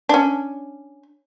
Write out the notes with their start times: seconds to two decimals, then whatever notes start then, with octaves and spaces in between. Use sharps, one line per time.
0.09 C#4 D4